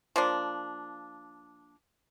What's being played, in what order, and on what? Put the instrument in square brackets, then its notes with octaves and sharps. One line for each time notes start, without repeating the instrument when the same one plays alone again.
[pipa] F3 A#3 D4